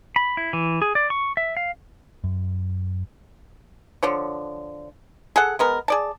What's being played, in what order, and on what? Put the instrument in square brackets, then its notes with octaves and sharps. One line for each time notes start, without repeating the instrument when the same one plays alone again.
[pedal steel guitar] B5
E4
E3
G#4
D5
C#6
E5
F5
[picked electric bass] F#2
[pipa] D3 F3 C#5
G#4 A4 F#5
G#3 B3 A#4
G#4 D5 A5